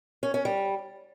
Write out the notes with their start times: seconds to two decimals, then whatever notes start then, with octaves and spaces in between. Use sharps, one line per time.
0.23 C#4
0.34 C#4
0.45 G3